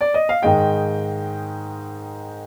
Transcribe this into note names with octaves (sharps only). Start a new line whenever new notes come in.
D5
D#5
F5
G#2 D#3 G#3 D#5 G5